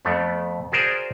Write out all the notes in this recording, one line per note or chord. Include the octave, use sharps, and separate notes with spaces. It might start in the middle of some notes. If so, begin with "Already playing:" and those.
F2 A3 B3
F#4 G#4 A#4 C5 D5